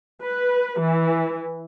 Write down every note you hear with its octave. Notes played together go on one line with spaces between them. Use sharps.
B4
E3